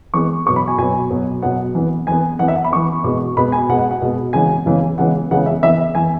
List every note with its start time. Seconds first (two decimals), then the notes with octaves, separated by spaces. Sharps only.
0.14 E3 G#3 B3 C#6
0.46 B2 F#3 B3 C#6
0.56 B5
0.68 G#5
0.78 B2 F#3 B3 G#5
1.11 B2 F#3 B3
1.43 B2 F#3 B3 F#5
1.75 E3 B3
2.07 E3 B3 G#5
2.39 E3 B3 F#5
2.48 E5
2.55 F#5
2.64 B5
2.72 E3 B3 C#6
3.04 B2 G#3 B3 C#6
3.37 B2 G#3 B3 B5
3.52 G#5
3.68 B2 G#3 B3 F#5
3.79 F#5
3.91 F#5
4.02 B2 G#3 B3
4.33 C#3 E3 G#3 B3 G#5
4.66 C#3 E3 G#3 B3
4.98 C#3 E3 G#3 B3 F#5
5.31 C#3 E3 G#3 B3 F#5
5.46 E5
5.63 E3 E5
5.68 B3
5.95 E3 B3 G#5